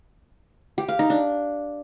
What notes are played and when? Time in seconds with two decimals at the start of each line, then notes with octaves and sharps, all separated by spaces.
0.78 G4
0.89 F5
0.99 D#4
1.10 D4